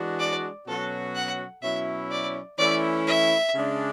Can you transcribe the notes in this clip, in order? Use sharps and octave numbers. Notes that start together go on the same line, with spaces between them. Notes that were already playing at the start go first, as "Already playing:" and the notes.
Already playing: E3 G#3 D4 F#4
D5
B2 F#3 C#4 F#4 A4
F#5
B2 F#3 C#4 E4 E5
D5
E3 A3 C#4 E4 D5
E5
C#3 G#3 D4